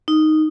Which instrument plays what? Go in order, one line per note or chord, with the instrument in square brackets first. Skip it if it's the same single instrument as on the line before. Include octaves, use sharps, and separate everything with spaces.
[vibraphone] D#4